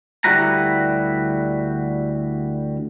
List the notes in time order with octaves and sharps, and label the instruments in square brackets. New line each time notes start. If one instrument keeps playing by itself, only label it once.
[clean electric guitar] D2 G3 E4 F#4 B4 A#5